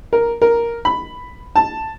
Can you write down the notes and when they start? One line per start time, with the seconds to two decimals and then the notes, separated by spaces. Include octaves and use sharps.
0.13 A#4
0.42 A#4
0.85 B5
1.56 A5